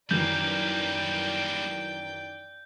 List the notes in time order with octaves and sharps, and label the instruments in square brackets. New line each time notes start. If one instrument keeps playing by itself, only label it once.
[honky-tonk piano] F#2 D#3 E3 [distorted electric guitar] G3 A#3 [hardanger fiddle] D5 G5 [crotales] G6